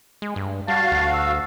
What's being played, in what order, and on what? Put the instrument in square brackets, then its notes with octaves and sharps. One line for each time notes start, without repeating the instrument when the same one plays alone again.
[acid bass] G#3
G2
[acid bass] G3 [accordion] F#4 F5 [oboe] A5
[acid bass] D2
[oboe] E6